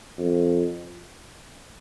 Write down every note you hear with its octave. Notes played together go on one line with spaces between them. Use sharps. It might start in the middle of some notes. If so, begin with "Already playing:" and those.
F2